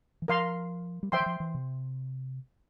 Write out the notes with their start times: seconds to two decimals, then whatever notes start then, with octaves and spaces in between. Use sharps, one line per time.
0.22 E3
0.28 F3 A#4 F5 C6
1.03 G3
1.12 F3 C5 E5 G5 C6
1.20 E3
1.26 F3
1.40 E3
1.54 C3